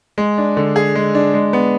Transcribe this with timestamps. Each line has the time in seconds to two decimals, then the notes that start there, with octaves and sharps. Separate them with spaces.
0.18 G#3
0.38 D4
0.57 D3
0.76 G#4
0.95 G#3
1.15 D4
1.34 G#3
1.53 B3